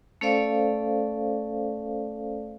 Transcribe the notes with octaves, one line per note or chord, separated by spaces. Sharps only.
A3 C#4 A4 C5 D5 F5